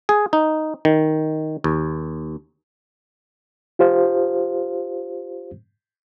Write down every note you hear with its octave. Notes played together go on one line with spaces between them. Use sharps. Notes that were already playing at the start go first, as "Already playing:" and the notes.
G#4
D#4
D#3
D#2
F4 G4 C5 F5